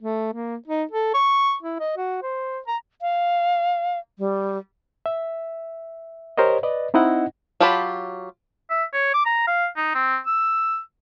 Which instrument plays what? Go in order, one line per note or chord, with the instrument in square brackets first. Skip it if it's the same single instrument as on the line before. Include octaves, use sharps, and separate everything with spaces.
[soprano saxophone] A3
A#3
D#4
A4
C#6
E4
D#5
F#4
C5
A#5
[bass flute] F5
G3
[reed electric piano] E5
G4 A#4 C5 C#5 D#5
B4 D5 D#5
C4 D#4 E4 D#5 F#5
[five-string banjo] F#3 F4 G4 A5 B5
[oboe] E5
C#5
D6
A#5
F5
D#4
C4
E6